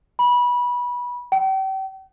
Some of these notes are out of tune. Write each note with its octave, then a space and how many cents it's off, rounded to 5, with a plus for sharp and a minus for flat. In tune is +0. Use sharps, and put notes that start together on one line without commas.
B5 -20
G5 -35